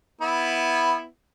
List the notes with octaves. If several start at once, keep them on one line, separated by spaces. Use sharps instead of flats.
B3 E4